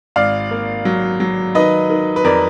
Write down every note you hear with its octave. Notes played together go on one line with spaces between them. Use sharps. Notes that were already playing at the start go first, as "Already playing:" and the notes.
G#1 D5 F5
A#3
F#3
F#3
D#3 B4 D#5
D#3
B4
F2 A#4 D5